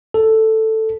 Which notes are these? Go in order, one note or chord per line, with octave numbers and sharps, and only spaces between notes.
A4